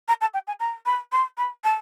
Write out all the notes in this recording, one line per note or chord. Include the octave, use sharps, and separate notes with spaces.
A#5
A5
G5
G#5
A#5
B5
C6
B5
A5